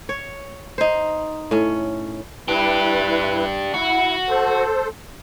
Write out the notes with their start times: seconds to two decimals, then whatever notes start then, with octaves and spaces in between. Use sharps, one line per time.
0.09 C#5
0.78 D#4 C5
1.51 A2 C#4
2.48 D4 E4 G4 B4
3.74 E4 F#4
4.29 A4 C5